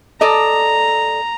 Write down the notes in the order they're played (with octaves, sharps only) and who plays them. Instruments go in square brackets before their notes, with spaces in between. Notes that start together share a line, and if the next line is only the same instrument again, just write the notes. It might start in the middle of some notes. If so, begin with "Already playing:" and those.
[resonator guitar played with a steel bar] A4 D5 D#5 [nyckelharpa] A#5